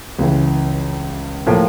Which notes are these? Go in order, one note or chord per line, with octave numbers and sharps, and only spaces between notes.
C#2 C#3 E3
A2 F3 A#3